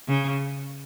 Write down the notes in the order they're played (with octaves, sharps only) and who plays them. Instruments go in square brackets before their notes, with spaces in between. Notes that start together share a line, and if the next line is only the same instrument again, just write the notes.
[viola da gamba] C#3